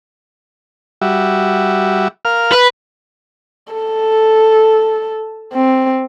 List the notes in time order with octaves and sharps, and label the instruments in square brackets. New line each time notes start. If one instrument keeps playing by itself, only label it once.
[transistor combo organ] G3 F#4 E5
A#4 F5 F6
[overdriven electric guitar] B4
[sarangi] A4
C4